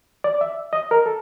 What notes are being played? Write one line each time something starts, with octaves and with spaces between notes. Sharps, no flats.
D5
E5
D#5
A#4
A4